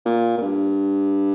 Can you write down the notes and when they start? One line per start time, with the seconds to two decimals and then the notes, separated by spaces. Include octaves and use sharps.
0.06 A#2
0.37 A#2
0.42 G2